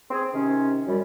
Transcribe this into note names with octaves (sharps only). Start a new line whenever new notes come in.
C4 G#4
C3 D#3 C#4
F#2 G3